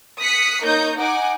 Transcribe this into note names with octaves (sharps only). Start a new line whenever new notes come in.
D#6 F#6 B6 C#7
A#3 D#4 C#5 G6
D#4 F#5 G#5 D6